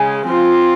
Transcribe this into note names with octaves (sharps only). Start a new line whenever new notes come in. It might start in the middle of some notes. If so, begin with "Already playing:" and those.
Already playing: C#3 G#3 G#5
F3 C4 F4